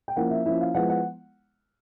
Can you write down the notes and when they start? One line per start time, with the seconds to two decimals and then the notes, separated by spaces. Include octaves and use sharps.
0.08 G5
0.16 F3 A#3 C#4 E4 F#5
0.31 E5
0.46 F3 A#3 C#4 E4 E5
0.61 F5
0.74 F3 G#3 B3 E4 F#5
0.90 F#5